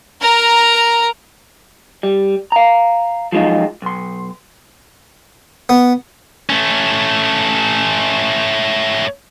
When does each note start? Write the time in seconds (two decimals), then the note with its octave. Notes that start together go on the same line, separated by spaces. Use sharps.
0.21 A#4 A#5
2.03 G3
2.52 F5 A#5
3.32 F3 F#3 G#3 D#4 F4
3.82 B1 C6
5.69 B3
6.50 A3 C#4